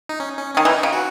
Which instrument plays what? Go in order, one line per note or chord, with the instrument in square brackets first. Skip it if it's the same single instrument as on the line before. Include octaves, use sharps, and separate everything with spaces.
[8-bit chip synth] D#4
C#4
C#4
[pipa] D#3 [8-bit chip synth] C#4
[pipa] E3 [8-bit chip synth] D#4
[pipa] C#3
[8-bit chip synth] F#4